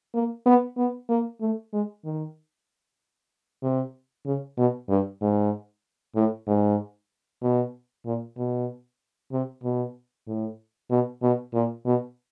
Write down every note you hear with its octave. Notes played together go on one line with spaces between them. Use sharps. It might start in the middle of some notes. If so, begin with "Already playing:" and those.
A#3
B3
B3
A#3
A3
G#3
D#3
C3
C#3
B2
G2
G#2
A2
G#2
B2
A#2
B2
C3
B2
A2
B2
B2
A#2
B2